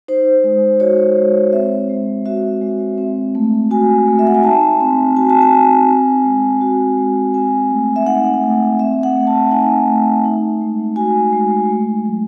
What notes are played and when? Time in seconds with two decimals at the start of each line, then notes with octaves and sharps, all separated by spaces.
0.08 D#4 C5
0.44 G#3
0.80 F#4 C#5
1.17 G#3
1.53 C4 E5
1.89 G#3
2.26 F#4 E5
2.62 G#3
2.98 C4
3.35 A3
3.71 F#4 G#5
4.07 A3
4.19 E5
4.27 F#5
4.35 G#5
4.43 D#4 A5
4.80 C4
5.16 F#4 G#5
5.30 A5
5.42 G#5
5.52 C4
5.88 C4
6.24 G#3
6.61 F#4
6.98 G#3
7.34 C4 G#5
7.70 A3
7.96 E5
8.06 D#4 F#5
8.43 A3
8.79 C4 E5
9.03 F#5
9.15 A3
9.27 A5
9.51 D#4 G#5
9.87 A3
10.25 D#4
10.61 G#3
10.96 F#4 G#5
11.33 G#3
11.70 A3
12.05 F#3